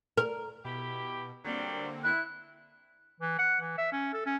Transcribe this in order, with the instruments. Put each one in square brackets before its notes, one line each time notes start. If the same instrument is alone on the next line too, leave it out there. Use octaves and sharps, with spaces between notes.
[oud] A#4
[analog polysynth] B2 [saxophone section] E4 G4
[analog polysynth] D3 A#3 C4 [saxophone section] F#3 G3
[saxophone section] E4 [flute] F#6
[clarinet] E3
F#5
E3
E5
C#4
A4
C#4